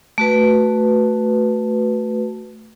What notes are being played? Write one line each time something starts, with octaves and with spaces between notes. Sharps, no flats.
A3 F#4 B4